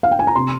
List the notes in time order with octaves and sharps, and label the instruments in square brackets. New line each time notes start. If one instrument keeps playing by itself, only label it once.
[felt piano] F5
G5
G#5
A#5
C3 C6